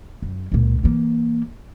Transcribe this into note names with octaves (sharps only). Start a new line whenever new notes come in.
F#2
C#2 A#2
E3 A#3